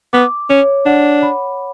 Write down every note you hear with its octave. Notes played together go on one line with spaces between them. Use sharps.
B3 D6
C#4 C#5
D4 F#5
B5